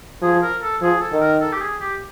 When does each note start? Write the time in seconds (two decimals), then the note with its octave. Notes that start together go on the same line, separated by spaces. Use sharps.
0.22 F3 G#4
0.43 A#4
0.62 A4
0.81 F3 G#4
1.01 A4
1.12 D#3
1.21 A#4
1.41 A4
1.53 G4
1.61 G#4
1.81 G4